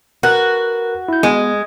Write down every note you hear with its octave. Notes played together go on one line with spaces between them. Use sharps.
F#4 A#4 B4 F#6
E4 G6
G#3 B3